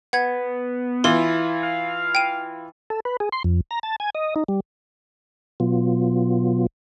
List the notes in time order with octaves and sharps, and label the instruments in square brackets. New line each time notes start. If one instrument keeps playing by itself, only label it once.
[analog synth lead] B3 [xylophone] F#5 G#6
[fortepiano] E3 E4 F4 [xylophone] C6
[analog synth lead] F5
[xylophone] G5 D#7
[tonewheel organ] A4
B4
G#4
C6
F2
A#5
A5
G#5
D#5
D#4
G3
B2 F#3 B3 F4